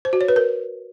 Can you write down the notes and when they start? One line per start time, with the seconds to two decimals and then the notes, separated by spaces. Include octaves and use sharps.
0.05 C5
0.13 F#4
0.21 C#5
0.28 B4
0.36 A#4